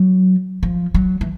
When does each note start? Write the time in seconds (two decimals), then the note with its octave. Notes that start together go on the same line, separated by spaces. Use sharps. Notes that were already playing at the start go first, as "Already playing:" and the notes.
Already playing: F#3
0.63 F3
0.94 F#3
1.21 E3